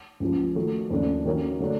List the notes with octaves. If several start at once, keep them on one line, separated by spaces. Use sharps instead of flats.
C#2 C#3 F3
D#3 F#3 A3
D#2 C#3 F3 A3 D4
D#3 F#3 A#3 C#4
D3 F#3 A3 D4